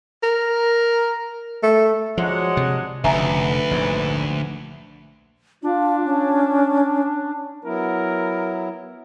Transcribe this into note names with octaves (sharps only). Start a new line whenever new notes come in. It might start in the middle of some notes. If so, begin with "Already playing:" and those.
A#4
A3
F3 F#3 G#3 D4 F#5
C3
F1 D2 C#3 B4 E5 G#5 A#5
A#1 G#2
D4 F4
C#4
F#3 B3 E4 A#4